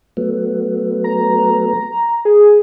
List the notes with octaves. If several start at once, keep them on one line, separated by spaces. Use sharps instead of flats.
F#3 A3 B3
A#5
G#4